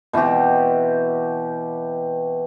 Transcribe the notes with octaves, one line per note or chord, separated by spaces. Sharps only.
B2 E3 C4 G4